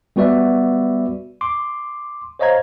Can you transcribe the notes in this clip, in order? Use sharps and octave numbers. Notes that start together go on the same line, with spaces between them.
G3 B3 F#4 B4 D5 E5
C6 D6
C5 C#5 D#5 F5 A#5 G#6